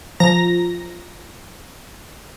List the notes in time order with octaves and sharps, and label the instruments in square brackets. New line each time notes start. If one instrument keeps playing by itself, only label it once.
[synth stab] F3 A#5 A#6